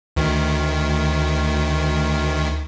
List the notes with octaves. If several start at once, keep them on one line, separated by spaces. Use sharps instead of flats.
D2 D#3